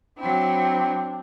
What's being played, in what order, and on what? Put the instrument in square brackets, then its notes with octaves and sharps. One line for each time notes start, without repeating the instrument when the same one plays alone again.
[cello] F#3 E4 [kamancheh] C4 D4